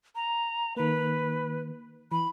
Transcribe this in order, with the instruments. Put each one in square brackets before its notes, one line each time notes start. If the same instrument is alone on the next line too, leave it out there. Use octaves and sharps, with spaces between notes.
[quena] A#5
[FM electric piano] D#3 A#3 [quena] B4
[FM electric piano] E3 [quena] B5